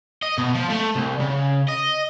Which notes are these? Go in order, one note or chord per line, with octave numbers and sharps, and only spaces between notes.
D#5
B2
F3
A3
C2
C#3
D#5